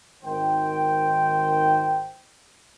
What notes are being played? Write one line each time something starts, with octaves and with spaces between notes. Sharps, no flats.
G#1 D#3 C5 G5